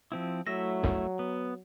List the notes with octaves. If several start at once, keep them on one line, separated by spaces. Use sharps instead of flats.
F3 C4 E4
F#3 A3 E4 E5 A#6
G1 C2 F#2
B3